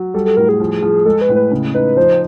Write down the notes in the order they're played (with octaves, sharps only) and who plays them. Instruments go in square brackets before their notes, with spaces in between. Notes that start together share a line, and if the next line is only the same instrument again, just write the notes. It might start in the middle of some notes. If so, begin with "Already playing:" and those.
Already playing: [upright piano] F#3
[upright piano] G3 [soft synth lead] A4
[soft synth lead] A4
[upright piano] A2 [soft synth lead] A#4
[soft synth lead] G#4
[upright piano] F3
F3
[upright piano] G#3 [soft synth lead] A4
[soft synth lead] B4
[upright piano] A2
[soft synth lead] B4
[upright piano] C#3
[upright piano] D#4 [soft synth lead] B4
[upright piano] F3 [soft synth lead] C5